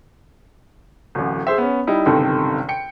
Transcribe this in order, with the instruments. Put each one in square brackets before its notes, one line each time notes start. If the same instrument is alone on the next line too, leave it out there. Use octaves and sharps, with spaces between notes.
[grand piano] D1 A1
G#4 C5 E5
B3 C#4
G3 D#4 E4
G1 C#2 C3 D#3 A4
G5 C#7